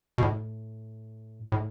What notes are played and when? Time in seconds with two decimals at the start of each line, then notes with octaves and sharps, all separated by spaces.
0.18 B2
0.22 A2
1.52 A2